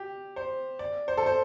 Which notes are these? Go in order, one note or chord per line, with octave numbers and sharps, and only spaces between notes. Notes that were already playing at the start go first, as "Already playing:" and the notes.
Already playing: G4
C5
D5
C5
A4
C5